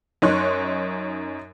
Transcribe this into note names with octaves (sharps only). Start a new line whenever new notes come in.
F#2 D#4 C#5 C6 F#6